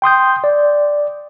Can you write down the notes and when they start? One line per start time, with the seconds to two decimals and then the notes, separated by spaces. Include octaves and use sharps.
0.02 G5 C6 D#6 G6
0.44 D5